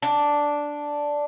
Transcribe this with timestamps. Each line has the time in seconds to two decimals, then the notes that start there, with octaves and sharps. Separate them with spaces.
0.02 D4